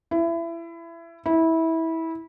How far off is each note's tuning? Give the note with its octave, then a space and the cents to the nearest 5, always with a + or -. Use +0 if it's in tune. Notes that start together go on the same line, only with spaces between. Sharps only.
E4 +25
E4 -20